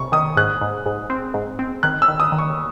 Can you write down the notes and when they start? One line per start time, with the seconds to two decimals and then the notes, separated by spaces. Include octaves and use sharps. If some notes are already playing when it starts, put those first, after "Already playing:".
Already playing: C3 C#6
0.12 D#3 D#6
0.37 G#2 F#6
0.61 G#2
0.86 G#2
1.10 C4
1.34 G#2
1.59 C4
1.83 D#3 F#6
2.02 E6
2.08 D#3
2.20 D#6
2.32 D#3
2.38 C#6